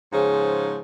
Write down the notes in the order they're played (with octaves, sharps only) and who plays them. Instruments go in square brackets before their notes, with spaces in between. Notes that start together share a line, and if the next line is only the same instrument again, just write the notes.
[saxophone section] G#2 C#3 F3